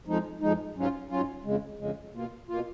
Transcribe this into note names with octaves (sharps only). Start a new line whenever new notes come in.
F2 F3 G#3 D#4
F2 F3 G#3 D#4
G#2 F#3 C#4 F4
G#2 F#3 C#4 F4
F2 C#3 G#3
F2 C#3 G#3
B2 A#3 F4
B2 A#3 F4